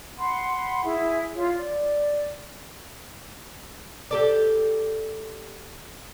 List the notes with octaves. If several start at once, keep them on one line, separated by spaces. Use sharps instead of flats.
F#5 B5 C6
E4 G#4 E5
F4 C#5
D5
G4 A4 D5